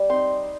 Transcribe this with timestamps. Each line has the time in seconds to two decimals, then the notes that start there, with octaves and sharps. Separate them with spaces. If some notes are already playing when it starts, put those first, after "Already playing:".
Already playing: G3
0.09 C4 D#4 C6